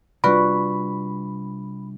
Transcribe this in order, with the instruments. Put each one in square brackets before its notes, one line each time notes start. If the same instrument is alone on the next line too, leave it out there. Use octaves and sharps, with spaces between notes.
[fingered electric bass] C3 G3 D4 [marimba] F4 B4 D5 [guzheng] F#4 [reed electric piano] B5